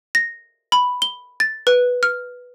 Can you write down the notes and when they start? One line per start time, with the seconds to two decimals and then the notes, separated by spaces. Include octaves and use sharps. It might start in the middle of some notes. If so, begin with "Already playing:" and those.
0.15 A#6
0.72 B5
1.02 G7
1.40 A6
1.67 B4
2.03 F6